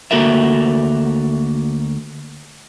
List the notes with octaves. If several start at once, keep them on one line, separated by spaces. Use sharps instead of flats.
D2 A#3 F#4 A4 A#4 E5